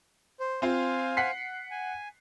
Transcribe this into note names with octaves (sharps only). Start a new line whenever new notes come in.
C5
C4 F4 C5 F5 G#5
F#5 B6 C7
G#5